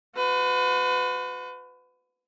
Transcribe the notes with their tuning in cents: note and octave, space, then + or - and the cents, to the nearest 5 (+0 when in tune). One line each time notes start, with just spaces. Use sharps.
F#4 -35 B4 +35